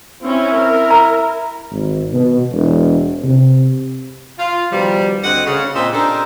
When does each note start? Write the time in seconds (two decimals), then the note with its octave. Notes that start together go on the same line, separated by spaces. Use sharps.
0.22 C4 C#4 E4
0.56 A#4
0.90 A#5
1.71 G#1
2.14 B2
2.52 E1
3.24 C3
4.39 F4
4.72 B2 D#3 F3 G3
5.23 D2 C4 D#5 F#5
5.46 C#3
5.74 A#2 C4 F4 C5 D#5 E5
5.93 D4 D#4 G4 A4 A#4 C5